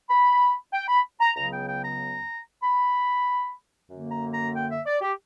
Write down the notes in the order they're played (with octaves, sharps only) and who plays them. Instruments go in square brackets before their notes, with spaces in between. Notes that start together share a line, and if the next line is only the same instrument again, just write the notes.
[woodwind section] B5
G5
B5
A#5
C#2 C#3 F#3 B3 A#5
G5
G5
A#5
B5
F#2 D3 A#3
A#5
A#5
G5
E5
D5
G4